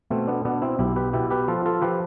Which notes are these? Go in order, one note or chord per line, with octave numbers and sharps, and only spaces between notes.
B2 A3 C4
B3 D4
B2 B3 D4
C4 E4
B1 E4 G4
G4 B4
B2 E4 G4
G4 B4
F3 F4 A4
F4 A4
F3 G4 B4